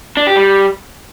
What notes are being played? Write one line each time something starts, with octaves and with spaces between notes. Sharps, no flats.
D4
G4
G3